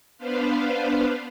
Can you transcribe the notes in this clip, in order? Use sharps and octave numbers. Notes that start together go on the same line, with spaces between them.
B3 D4 B4 C5 F5